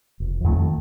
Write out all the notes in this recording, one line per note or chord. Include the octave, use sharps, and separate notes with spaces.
F1
F2 D#3 A3